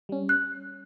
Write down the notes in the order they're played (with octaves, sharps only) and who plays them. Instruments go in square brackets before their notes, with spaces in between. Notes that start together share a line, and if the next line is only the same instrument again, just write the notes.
[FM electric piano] G3 C#4
[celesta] F#6